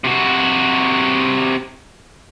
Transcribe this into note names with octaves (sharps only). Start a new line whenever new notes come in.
C3 F#4